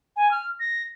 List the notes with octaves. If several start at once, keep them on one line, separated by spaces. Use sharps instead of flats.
G#5
F6
A#6